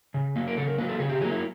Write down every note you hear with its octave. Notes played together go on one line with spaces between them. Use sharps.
C#3
F#3 A#3
A#4
C#3 A4
A#4
F#3 A#3 B4
A4
C#3 G#4
G4
F#3 A#3 G#4
E4